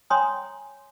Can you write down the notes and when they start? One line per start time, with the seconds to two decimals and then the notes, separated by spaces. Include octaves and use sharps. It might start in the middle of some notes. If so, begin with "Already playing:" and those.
0.10 C#5 G5 G#5 A#5 C6 D#6